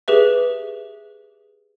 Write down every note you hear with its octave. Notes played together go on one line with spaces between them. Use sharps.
G4 G#4 B4 E5